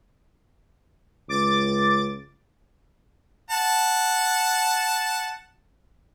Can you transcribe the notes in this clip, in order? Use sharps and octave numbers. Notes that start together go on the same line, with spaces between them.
C#2 D6 A6
F#5 A5